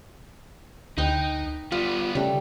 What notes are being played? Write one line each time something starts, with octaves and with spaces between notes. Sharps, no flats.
D2 D#4 B4 G5
G3 B3 F4
C#3 G3 A3